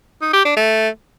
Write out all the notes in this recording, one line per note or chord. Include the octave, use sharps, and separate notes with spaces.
D#4
G4
D4
A3